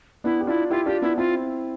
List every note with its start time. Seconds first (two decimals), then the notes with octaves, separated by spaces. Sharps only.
0.24 B3 D4 E4
0.41 G4
0.47 D4 E4 F4
0.71 E4 F4 G4
0.86 D4 F4 G4
1.02 B3 D4 E4
1.18 C4 E4 F4